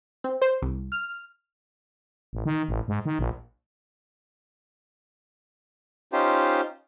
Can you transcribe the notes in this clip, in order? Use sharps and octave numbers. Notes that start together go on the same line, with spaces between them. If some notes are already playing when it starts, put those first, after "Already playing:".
C4
C5
C2
F6
A1
D#3
A1
G#2
D#3
A#1
C#4 D#4 F4 G4 C5